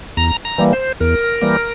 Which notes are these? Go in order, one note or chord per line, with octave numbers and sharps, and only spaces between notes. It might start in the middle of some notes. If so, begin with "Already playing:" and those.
E2 A#5
A#5
E3 G3 A#3
C5
E2 A#4
E3 G3 A#3